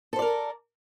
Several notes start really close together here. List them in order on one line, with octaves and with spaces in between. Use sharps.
A4 C5 D5 A#4